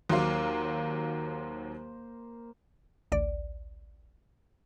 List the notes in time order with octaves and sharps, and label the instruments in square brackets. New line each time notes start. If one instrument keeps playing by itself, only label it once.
[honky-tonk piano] D#2 F#3 F5 [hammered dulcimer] A#3 C5
[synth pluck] A1 D2 D5